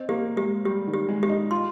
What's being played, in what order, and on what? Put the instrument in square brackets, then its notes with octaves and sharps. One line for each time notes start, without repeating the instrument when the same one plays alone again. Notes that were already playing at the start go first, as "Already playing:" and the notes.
Already playing: [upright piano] C4 [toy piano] D#5
[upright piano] A#3 [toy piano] G4
[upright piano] G#3 [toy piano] G4
[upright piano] G3 [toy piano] G4
[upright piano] D#3
[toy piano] G4
[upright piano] G#3
[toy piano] G4
[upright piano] D#4
[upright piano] F4 [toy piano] C6